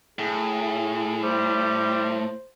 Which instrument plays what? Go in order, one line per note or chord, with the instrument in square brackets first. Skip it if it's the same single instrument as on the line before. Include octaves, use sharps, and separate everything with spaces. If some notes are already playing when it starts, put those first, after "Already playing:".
[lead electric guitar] A2 [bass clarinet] G#4
[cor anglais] G3 [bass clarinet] C5